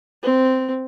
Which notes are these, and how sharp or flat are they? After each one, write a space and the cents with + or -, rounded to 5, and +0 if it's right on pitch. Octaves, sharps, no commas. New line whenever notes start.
C4 -10